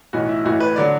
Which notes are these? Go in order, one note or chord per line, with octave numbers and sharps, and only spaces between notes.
B1 A2 E3 F#4
E4
A1 A2 E3 F#4
B4
D3 F#3 D5